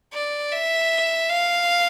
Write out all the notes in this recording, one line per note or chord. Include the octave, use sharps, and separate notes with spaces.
D5
E5
F5